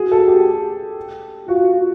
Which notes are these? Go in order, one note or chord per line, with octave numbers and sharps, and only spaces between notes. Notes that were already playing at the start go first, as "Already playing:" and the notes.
Already playing: F#4 G#4
A4
G4
F4 F#4